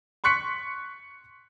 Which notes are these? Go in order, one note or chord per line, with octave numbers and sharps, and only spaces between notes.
C6 C#6 F#6 B6 C#7